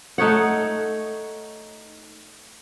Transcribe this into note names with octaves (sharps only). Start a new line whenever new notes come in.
A3 D#4 C#5 F#5